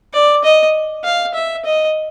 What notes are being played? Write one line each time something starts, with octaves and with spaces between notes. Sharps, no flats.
D5
D#5
F5
E5
D#5